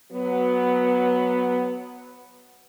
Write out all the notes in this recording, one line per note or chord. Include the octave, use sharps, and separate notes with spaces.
F#3 B3